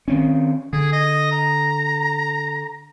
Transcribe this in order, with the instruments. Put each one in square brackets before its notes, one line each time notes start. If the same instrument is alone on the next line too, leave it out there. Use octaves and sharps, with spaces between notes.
[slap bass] D#3 C4 C#4
[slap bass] D3 [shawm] G#4
[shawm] D#5
A#5